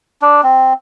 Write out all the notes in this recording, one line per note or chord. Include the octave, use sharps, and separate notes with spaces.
D4
C4